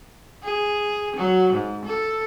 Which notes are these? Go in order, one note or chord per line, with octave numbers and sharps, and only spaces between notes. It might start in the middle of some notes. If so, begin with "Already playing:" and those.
G#4
F#3
G#2
A4